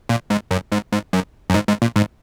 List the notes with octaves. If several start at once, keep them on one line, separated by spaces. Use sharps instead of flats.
A#2
G#2
F#2
G#2
G#2
F#2
F#2
G#2
G#2
A#2
G#2